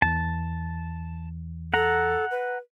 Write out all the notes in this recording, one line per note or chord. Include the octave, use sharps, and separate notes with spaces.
E2 E3 A5
A4 F#5 A#5
B4